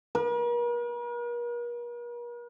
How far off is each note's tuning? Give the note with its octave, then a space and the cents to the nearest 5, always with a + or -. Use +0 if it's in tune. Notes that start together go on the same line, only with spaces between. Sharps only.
A#4 +45